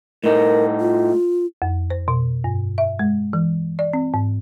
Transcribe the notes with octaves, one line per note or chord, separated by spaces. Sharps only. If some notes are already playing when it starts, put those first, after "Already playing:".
A2 D#4 A#4
F4
F2
C5
B2
G2
E5
G#3
E3
D5
C4
G#2